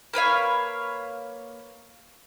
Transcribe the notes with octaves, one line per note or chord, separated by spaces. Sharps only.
A#3 B4 C#5 F5